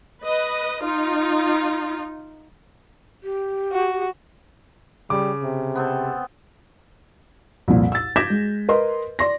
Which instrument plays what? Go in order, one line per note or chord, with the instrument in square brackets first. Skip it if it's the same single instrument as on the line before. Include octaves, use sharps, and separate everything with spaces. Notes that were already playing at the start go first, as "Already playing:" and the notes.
[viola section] B4 D#5
D#4 F4
[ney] G4
[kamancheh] F#4
[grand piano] C#3 D6 [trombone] G3
[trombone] C3
[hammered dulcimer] B3 C4 A4
[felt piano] C2 F2 A#2
E6 A6
D6 G6 G#6 A#6 B6 E7
G#3
A#4 B4 D#5 C6
D5 C6 A#6